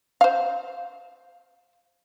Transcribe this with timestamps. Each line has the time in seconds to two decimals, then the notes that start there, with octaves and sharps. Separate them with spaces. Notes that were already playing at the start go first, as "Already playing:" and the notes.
0.21 C5 F5